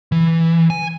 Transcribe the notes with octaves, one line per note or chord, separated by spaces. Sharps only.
E3
G#5